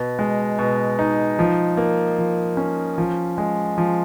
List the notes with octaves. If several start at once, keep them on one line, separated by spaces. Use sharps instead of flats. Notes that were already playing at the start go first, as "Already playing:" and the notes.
Already playing: B2
G#3
B2
D#4
F3
A#3
F3
C#4
F3
G#3
F3